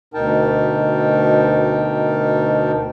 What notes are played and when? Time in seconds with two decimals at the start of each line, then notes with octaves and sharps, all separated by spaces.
0.14 D2 B2 D#4 A#4 G5 A5